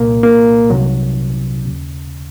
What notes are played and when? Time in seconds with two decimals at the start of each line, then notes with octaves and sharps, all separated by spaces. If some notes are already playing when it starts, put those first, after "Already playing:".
Already playing: C2 A#2 A#3
0.23 A#3
0.70 C2 C3 D#3 F#3
1.65 D#2 C#3